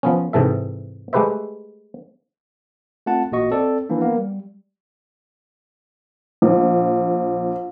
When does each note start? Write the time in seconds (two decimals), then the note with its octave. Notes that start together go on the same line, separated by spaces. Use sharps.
0.03 F3 B3 C#4
0.33 G#2 C3 E3 A4 E5
1.13 G#3 A3 G4 B4 C5 E5
3.06 A3 C4 F4 F#5 A5
3.31 A1 A#2 A#3 F#4 D#5 C#6
3.51 C4 A4 D5
3.89 E3 F3 A#3 D4
4.02 A#3 B3
4.17 G3
6.42 A#1